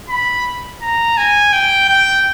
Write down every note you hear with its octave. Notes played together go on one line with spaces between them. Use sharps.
B5
A#5
G#5
G5
G5